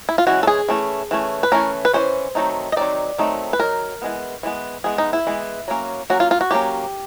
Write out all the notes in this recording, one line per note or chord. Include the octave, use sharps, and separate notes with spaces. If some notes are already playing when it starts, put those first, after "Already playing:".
E4
F4
E3 G#3 C#4 F#4
A4
G#4
E3 A3 C#4
E3 A3 C#4
B4
E3 A3 C#4 A#4
B4
E3 A3 C#4 C5
D#3 F#3 A3 C4 D#4
D#5
D#3 F#3 A3 C4 D#4 D5
D#3 F#3 A3 C4 D#4
B4
D#3 F#3 D#4 A#4
E3 G#3 B3
E3 G#3 B3
E3 G#3 B3 G#4
D#4
E4
E3 G#3 B3
F#3 A#3 C#4
F#3 A#3 C#4 F#4
F4
F4
F#4
F#3 A#3 C#4 G4